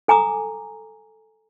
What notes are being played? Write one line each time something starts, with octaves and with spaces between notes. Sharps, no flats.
A4 G#5 A#5 D6 D#6